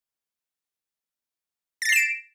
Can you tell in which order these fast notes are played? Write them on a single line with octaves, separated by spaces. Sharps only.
A6 A#6 C7 E7 D7